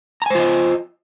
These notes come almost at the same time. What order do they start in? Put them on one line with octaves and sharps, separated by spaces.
A#5 G#5 C5 F4 D#5